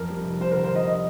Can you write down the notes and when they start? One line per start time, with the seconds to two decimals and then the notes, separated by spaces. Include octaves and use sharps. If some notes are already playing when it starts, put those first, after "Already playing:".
Already playing: F2 A#4
0.10 G3
0.25 F1
0.41 G3 C5
0.52 D3 A#4
0.64 C5
0.72 D3 D#5
0.87 D#5